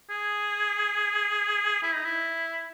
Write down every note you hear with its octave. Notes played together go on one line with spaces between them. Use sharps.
G#4
E4
D#4
E4